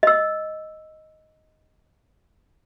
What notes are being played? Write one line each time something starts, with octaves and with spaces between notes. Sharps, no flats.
D#5 E6